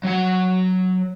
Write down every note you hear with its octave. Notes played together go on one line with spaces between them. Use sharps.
F#3 F#5